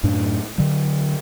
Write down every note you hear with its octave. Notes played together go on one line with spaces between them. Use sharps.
F#2 A2 D4
D3 F#3